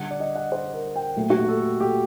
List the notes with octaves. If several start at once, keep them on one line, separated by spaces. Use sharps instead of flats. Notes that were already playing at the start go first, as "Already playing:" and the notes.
Already playing: D3 G3 F#5
D5
D#5
F#5
C5
A#4
G5
A#2 F#3 A3
F#4
G4
A4
G4